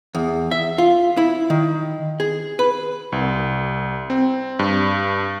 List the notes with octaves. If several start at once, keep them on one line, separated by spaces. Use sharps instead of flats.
E2
E5
F4
E4
D#3
G#4
B4
C2
C4
G2